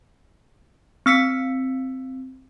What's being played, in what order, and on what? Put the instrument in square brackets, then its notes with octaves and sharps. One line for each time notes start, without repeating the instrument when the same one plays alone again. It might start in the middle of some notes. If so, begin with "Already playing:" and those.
[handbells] C4 E6 B6 C#7